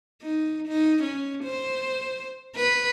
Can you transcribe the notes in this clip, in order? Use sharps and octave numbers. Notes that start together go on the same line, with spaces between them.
D#4
D#4
C#4
C5
B4